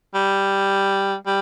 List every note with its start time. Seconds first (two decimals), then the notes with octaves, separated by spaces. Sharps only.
0.14 G3
1.26 G3